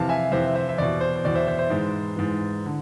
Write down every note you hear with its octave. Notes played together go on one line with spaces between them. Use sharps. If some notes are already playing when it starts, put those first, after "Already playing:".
Already playing: F2 C3 E3 F5 A5
E5 G#5
F2 C3 E3 C5 E5
C5 E5
E5
E2 B2 D5
C5
C5
E2 B2 D5
C5 E5
C5 E5
C5
G#2 E3
G#2 E3
D3